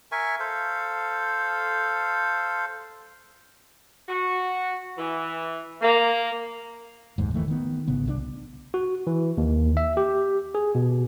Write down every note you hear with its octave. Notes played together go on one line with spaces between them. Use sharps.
A#4 E5 G#5 C#6
A4 C5 F5
F#4
E3
A#3
F#1 D#2 G#2
D#3 E3 A3 A#3
D#3 B3
G#1 C#3 B3
C2 D3 D4
F#4
E3
D#2
E5
G4
G#4
B2